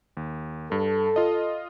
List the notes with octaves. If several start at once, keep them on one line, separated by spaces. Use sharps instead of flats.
D#2
G2 A4
F4 D#5